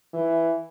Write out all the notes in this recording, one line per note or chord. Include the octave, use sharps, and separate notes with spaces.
E3